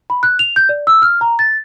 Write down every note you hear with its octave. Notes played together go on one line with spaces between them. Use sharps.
B5
F#6
F7
G6
D5
E6
F6
A#5
A6